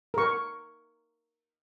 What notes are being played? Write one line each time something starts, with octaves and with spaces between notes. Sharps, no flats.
A#4 C#6